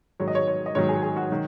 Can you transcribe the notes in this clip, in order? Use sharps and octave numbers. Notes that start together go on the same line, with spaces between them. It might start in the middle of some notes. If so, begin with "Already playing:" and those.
G#2 D#3 F#3 C#5
D#5
C#5
C#5
D#5
G#2 D#3 F#3 C#5
G#4
G#4
F#4
D#3 F#3